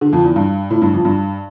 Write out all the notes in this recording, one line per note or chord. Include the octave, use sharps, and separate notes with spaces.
D3
F2
E2
G2
A2
G2
F2
G2